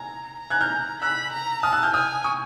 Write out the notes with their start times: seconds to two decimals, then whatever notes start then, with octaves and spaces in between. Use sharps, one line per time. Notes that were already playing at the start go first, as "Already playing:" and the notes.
Already playing: A#5 G#6
0.41 A#5
0.50 F#6 G#6
0.61 F6 G6
1.02 B5 E6 F#6
1.33 A#5
1.63 A5 D#6 F6
1.73 E6 F#6
1.83 F6 G6
1.94 G#5 D#6 F6
2.24 C#6 D#6